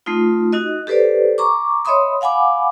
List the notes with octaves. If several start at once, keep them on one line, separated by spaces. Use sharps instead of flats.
A3 C4 D#4 F4
D#4 F#4 D#5
G4 A4 B4 C5 D5
A#5 C#6 D6
C#5 D#5 E5 B5 C6 D#6
F5 F#5 G#5 B5 D6